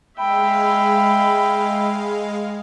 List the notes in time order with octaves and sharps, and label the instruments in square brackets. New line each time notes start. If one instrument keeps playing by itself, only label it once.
[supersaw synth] G#3 F5 [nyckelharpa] E5 G5 [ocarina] B5